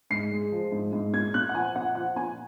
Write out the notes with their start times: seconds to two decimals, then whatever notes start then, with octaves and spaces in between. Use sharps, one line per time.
0.10 G#2 C7
0.32 G#3
0.52 F3
0.72 G#2
0.93 G#2
1.13 A#2 G#6
1.34 A#2 F#6
1.49 F#5
1.54 F3 G#5
1.76 A#2 F#5
1.95 F3 F#5
2.16 A#2 G#5